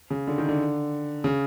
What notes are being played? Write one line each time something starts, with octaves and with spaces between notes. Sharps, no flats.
C#3
D3
D#3
D3
C#3